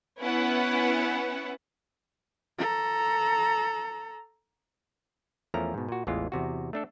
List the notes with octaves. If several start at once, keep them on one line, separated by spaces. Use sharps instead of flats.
B3 C#4 E4 B4 F#5
A4 A#5
E2 F3 A3 C#4 A#4 A#5
G#2 B2
A#2 F#4
A1 E2 E3 G#3 F4
E2 C3 F#4
A3 D4 A4